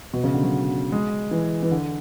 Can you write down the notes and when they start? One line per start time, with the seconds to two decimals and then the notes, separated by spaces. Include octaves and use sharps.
0.13 B2
0.24 C#3
0.34 D3
0.43 F#3
0.92 G#3
1.31 E3
1.63 E3
1.71 D3